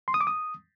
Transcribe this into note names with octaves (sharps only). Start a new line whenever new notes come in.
C6
D#6
D6
D#6